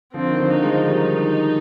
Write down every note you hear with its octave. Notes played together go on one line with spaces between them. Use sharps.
D3 F3 C4
D#3
D3 F3
D#4
F3 G#3
D#3 G3 D#4